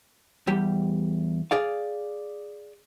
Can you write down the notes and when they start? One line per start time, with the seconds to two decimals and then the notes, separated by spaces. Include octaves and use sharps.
0.47 E2 G3 G4
1.51 G#4 D5 F5